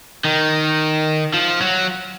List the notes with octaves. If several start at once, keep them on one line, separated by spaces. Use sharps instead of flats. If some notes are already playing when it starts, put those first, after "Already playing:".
D#3
F3
F#3